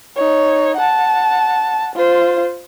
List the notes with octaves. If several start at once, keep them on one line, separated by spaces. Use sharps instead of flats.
D#4 C#5
F#5 A5
F4 C5